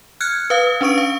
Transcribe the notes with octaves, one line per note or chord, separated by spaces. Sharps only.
F6 F#6 G#6 C#7
B4 F5 D#6
C#4 D4 B4 C#6 D#6 D7
F5